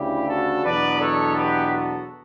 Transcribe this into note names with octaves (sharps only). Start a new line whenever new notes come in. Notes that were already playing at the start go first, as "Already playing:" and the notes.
Already playing: D2 C#3 G3 E4 G4
F#4 A4
E2 B2 F#3 B3 D4 B4 D5
A4 C#5
G4 B4
F#4 A4